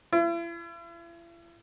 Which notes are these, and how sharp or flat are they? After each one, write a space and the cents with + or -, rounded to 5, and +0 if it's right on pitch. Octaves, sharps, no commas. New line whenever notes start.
E4 +40